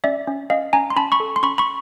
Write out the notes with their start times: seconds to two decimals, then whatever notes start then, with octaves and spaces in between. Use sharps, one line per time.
0.04 C#4 D5 E5
0.28 C#4
0.50 C#4 D#5 F5
0.73 C#4 G#5 A#5
0.90 C6
0.96 C#4 A5 B5
1.12 B5 C#6
1.20 A4
1.36 C6
1.43 C#4 B5 C#6
1.58 B5 C#6